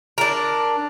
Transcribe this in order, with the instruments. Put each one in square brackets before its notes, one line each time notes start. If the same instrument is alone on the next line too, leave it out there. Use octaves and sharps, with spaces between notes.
[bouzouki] D4 A#4